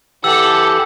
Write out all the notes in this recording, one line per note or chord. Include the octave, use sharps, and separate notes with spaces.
E3 G4 A4 F#5 E6